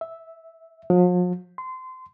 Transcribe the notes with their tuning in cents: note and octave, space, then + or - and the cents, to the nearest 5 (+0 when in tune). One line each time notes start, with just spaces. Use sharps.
E5 -10
F3 +45
C6 -25